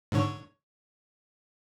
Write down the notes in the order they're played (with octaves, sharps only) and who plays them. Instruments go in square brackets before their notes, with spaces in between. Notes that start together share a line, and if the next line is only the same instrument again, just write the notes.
[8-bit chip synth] G#2 D3 C#5